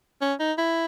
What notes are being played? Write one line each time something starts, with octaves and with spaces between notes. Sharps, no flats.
C#4
D#4
E4